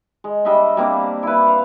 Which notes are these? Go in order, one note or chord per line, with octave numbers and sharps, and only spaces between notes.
G#3
G3 D4 D#5 E5
G3 A#3 C4 D4
E4 B4
F5